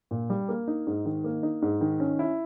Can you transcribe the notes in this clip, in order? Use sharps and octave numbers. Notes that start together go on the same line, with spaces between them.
A#2
G3
A#3
D#4
G#2
D#3
A#3
D#4
G#2
D#3
C#4
E4